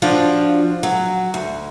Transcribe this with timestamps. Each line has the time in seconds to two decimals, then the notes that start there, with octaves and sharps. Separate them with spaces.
0.02 F3 D4 F4 F#4
0.83 F#3
1.34 D2